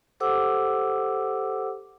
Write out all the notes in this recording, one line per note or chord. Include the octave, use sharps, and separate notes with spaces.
G4 A4 C5 F#5 D6 E6